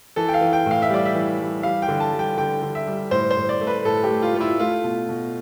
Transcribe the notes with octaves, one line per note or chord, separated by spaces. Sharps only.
E3 A4
G5
F5
E3
G5
A2 F5
E5
G3 D5
E5
E3
G3
G3 F5
G5
D3
A5
G3
G5
D3 G5
D3
E5
G3
A2 C5
C5
A2
D5
A3
B4
A2 A4
G4
A3
F4
A3 F4
E4
A3 F4
B2
B2